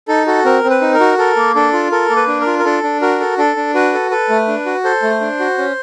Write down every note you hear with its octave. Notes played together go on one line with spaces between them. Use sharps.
D#4 A4
F#4 A4
C4 A#4
C4
B4
D#4
A#4
F#4
A4 A#4
A#3
D4 A4
F4
A4 A#4
A#3
B4
D4
A#4
F4
A#4
D4 A4
D4
F#4 A#4
A4
D4 A4
D4
F#4 B4
A4
A4 B4
A3
D4
F#4
A4 C5
A3
D4
F#4
C#4